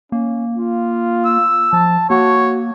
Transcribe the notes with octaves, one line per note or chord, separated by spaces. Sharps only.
A#3 C#4
F4
E6
F3 A5
A#3 F#4 C#5